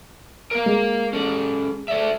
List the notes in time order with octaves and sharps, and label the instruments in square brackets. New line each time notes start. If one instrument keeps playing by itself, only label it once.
[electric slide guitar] A#4 F5
[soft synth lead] G#3
[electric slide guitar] C#4 A4
A4 D5 E5